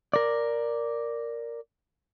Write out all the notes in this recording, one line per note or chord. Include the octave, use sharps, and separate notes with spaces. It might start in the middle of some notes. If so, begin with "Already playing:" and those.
A#4 D5